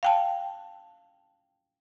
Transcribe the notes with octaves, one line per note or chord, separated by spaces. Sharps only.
F5 G5 A5